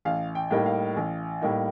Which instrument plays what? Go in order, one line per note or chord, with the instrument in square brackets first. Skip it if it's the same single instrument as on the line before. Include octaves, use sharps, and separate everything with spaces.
[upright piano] A1 F5
G5
A2 G3 A#3 D#4
F5
A1
A2 G3 A#3 D#4